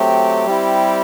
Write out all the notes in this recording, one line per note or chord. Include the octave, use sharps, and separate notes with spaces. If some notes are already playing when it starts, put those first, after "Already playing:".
Already playing: F#3 A3 C4 G4
G3 C4 E4